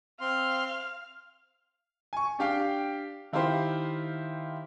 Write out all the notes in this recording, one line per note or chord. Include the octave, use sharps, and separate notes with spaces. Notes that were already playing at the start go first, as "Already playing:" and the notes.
C4 F5 C6
G#5 C#6
D4 G4 F5 G5
D#3 E4 F4 G4 C5